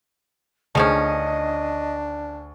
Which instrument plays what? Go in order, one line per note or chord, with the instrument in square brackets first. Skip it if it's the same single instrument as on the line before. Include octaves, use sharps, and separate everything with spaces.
[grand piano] D2 G#4 [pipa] D#3 F3 C#4 [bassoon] D4 [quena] D#5